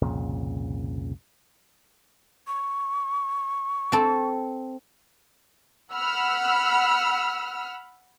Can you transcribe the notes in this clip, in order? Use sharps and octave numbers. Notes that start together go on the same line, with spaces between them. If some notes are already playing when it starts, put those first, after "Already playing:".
C2 F2 A#2 C#3
C#6
C4 A4
F#5 B5 E6 F6